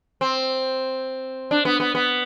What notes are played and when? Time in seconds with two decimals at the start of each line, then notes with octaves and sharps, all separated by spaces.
0.21 C4
1.51 D4
1.65 B3
1.80 B3
1.95 B3